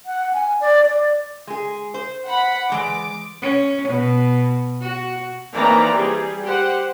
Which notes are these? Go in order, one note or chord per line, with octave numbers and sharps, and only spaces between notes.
F#5
G#5
D5
D5
G#3 G#4
C5
F#5 B5
E3 G#3 D5 D6
C#4
B2
F#4
E3 A#3 C4 D#4 D5 A#5
G3 G#4
G4 C5 F#5